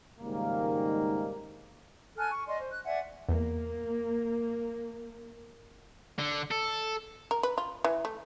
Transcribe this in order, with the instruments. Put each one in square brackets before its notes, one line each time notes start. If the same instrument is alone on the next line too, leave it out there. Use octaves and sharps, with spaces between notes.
[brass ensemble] C#2 G#2 D#3 G3 A#3
[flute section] A4 G#5 F6 F#6
C#6
D5 D#5 C6
C5
F#6
D5 E5 F#5 G#5
[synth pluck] E2 [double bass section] A#3
[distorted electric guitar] D3
A4
[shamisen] A#4
B4
F4
E3
A3